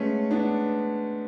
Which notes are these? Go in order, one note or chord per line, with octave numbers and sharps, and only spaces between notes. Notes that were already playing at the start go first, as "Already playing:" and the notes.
Already playing: G#3 A3 B3 C#4
B3 D4